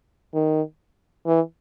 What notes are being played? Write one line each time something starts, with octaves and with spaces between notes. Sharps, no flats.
D#3
E3